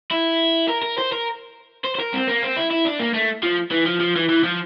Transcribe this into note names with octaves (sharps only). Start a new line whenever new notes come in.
E4
A#4
A#4
C5
A#4
C5
C5
A#4
C4
A#3
C4
E4
E4
D4
A#3
A3
F3
E3
F3
F3
E3
E3
F3